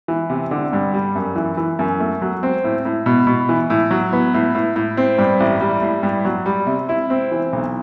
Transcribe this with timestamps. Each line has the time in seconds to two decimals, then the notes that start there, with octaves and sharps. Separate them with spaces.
0.08 E3
0.30 C3
0.51 D3
0.73 G2
0.94 G3
1.15 F#2
1.36 E3
1.57 E3
1.79 F#2
2.00 A3
2.22 F#3
2.43 C4
2.64 A2
2.85 A2
3.06 B2
3.27 B2
3.49 E3
3.70 A2
3.91 F#3
4.13 B3
4.34 A2
4.55 A2
4.76 A2
4.97 C4
5.18 G2
5.40 A1
5.61 G3
5.82 A2
6.03 G2
6.25 F#3
6.46 G3
6.67 C3
6.89 E4
7.10 C4
7.32 E3
7.53 B1